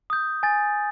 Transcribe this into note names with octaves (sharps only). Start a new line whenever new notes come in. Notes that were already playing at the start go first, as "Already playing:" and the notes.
D#6 G6
G#5 A6